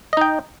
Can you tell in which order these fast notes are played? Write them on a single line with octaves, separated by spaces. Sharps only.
D#5 D#4 G5